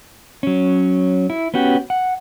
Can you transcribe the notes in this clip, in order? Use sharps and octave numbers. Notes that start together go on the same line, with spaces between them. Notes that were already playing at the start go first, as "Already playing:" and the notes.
F#3 C#4
E4
B3 C#4 F#4 G4
F#5